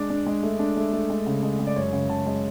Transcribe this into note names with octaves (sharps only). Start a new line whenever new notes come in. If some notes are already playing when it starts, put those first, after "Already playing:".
Already playing: G#3 D4 D5
D4
G#3
A3
D4
A3
A3
G#3
C#3
G#3
G#3
D5
F#2 C#5
C#3
C#3 A5
G#3